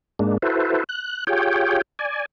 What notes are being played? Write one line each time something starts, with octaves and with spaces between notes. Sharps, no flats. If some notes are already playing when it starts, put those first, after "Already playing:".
G#2 G#3 A#3 D4
E4 F#4 A4 B4 C5
F#6
F4 G4 G#4 C#5 G5
D5 G#5